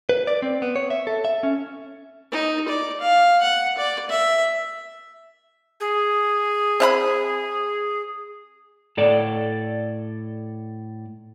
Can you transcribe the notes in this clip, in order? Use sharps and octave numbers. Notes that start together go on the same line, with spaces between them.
B4
D5
C4
B3
C#5
E5
A4
E5
C#4
D#4
D5
F5
F#5
D5
E5
G#4
C4 F5 B5
A2 A4 D5